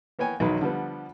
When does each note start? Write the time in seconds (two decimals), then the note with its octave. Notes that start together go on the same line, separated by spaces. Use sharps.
0.19 A#3 B3 C#5 G5 G#5
0.40 B1 E2 D#3 F#3 D#4 B4
0.61 D3 F3 G3 B3